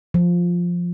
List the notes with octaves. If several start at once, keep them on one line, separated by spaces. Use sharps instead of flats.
F3